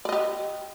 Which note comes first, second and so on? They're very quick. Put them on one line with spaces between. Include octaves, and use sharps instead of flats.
D5 D#5 G4